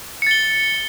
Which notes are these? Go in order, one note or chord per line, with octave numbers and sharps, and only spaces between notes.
A6 C#7 G7